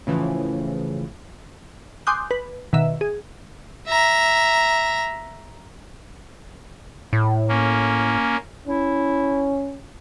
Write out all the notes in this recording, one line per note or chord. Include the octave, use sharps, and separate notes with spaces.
A2 C#3 E3 F3
G#5 C6 D6 D#6 F#6 G6
B4
B2 D#3 E5
G#4
E5 A#5
A2
A#3 C#4
C#4 E4